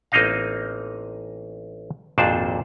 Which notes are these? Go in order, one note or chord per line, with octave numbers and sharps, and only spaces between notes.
A1 A#3 C4 D#4 D#5 F5
G#1 F2 A#2 D4 C5 A5